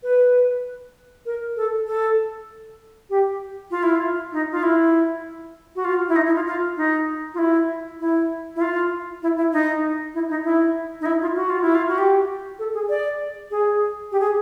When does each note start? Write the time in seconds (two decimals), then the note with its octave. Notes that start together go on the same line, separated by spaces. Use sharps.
0.03 B4
1.26 A#4
1.56 A4
1.87 A4
3.10 G4
3.71 F4
3.83 E4
3.96 F4
4.32 D#4
4.52 F4
4.63 E4
5.76 F#4
5.85 F4
6.09 E4
6.16 D#4
6.26 E4
6.35 F4
6.46 F4
6.77 D#4
7.34 F4
7.39 E4
8.00 E4
8.56 E4
8.61 F4
9.23 E4
9.37 E4
9.53 D#4
10.14 E4
10.29 D#4
10.44 E4
11.01 D#4
11.06 E4
11.21 F4
11.36 F#4
11.50 F4
11.62 E4
11.75 F4
11.88 F#4
11.98 G4
12.59 A4
12.74 G#4
12.89 D5
13.51 G#4
14.12 G4
14.20 G#4